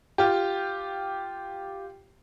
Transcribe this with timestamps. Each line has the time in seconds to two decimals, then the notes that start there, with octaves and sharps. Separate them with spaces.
0.18 F4 G4